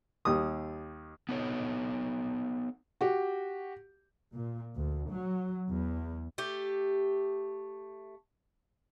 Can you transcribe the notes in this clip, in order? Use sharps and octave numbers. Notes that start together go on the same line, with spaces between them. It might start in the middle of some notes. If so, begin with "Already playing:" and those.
D#2 G3 D#6
B3 D#4 A4 C#5
F#4 G4
A#2
D2
F#3
E2
A3 G4